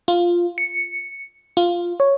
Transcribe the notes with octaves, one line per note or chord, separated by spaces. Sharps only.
F4
C#7
F4
C#5